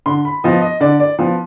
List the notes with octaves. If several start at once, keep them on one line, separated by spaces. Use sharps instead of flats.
D3 C6
B5
F3 B3 D#5
D#5
D3 D5
D5
F3 B3